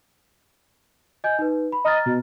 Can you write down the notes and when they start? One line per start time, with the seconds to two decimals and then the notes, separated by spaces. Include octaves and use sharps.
1.24 D#5 G#5 G6
1.39 D#4 B4
1.72 B5
1.85 D#5 A#5 F6 A6
2.06 B2